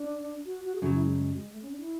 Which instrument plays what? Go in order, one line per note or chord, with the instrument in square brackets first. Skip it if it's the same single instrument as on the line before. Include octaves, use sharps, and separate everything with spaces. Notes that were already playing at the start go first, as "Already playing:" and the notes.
Already playing: [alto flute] D4
F#4
F#4
G#4
[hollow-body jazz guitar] F#2 C#3 F#3 [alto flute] F#4
[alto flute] E4
G#3
G#3
G#3
A3
C#4
D4
E4